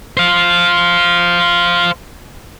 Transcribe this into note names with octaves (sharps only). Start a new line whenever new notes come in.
C5 F5